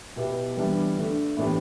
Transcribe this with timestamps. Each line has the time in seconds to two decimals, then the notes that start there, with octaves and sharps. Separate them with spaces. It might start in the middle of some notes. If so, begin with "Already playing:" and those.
0.16 B2 B3 E4 G4
0.57 E3 G3 B3 D4
0.96 D3 A3 D4
1.37 A2 E3 B3 D4 G4